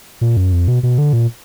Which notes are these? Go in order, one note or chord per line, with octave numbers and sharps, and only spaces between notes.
A#2
F#2
F2
B2
B2
D3
A#2